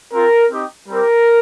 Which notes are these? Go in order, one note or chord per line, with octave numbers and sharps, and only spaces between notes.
C4 F4 A#4
C4 D#4 G4
G3 C4 G4 A#4